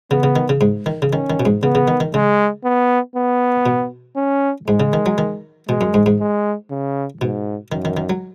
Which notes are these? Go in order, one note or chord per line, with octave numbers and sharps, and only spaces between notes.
C#3 B3
C#3
D#3
C#3
G#2
D#3
C#3
D#3 C#4
D#3
B2
G#2
C#3 B3
C#3
D#3
D#3
C#3 G#3
B3
B3
B2
C#4
G#2 G#3
C#3
D#3
F#3
D#3
B2 G#3
F#2
G#2
G#2
G#3
C#3
G#2 B2
F#2 D#3
D#3
D#3
F#3